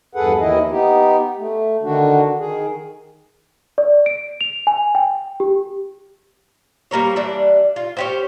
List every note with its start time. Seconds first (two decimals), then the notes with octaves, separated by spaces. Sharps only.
0.15 E2 G2 G#4 A4 B4 F#5
0.40 D#2 D#3 E3 E4 D#5
0.70 B3 D#4 G4
1.38 A3
1.83 D3 D#3 D4 F#4
2.39 D#3 G#4
3.78 D5
4.06 D7
4.41 F7
4.67 G#5
4.95 G5
5.40 G4
6.91 G3 A#3 A#4 C#5
7.16 E3 G3 D4
7.76 F4
7.97 C#4 G4 C5